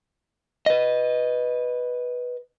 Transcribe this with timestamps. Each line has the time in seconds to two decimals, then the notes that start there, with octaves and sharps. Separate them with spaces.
0.66 B4 D#5